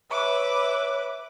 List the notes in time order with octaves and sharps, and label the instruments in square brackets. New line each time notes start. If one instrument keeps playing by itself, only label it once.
[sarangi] B4 [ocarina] C#5 [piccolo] E5 [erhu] D6